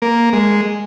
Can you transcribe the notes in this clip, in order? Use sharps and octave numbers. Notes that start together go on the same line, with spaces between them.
A#3
G#3